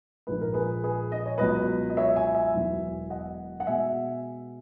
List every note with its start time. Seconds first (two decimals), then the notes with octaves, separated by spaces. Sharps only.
0.27 A#1 A#2 G#3 B4
0.41 A#4
0.54 G#4 B4
0.83 G#4 B4
1.12 D#5
1.26 C#5
1.38 C#2 B2 F#3 B4 D#5
1.90 D#5
1.97 C#5 E5
2.16 E5 G#5
2.34 E5 G#5
2.54 E1 E2 B2 F#3
3.10 D#5 F#5
3.60 F#5
3.67 B2 G#3 E5 G#5